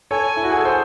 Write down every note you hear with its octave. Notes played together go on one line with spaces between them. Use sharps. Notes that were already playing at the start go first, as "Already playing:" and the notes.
A4 C#5 G#5
E4
F#4
G#4
A4
G#4 C5